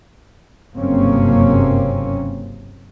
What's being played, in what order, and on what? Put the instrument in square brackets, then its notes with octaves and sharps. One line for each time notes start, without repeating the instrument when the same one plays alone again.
[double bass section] F#1 G2 C3 A#3 C4 C#4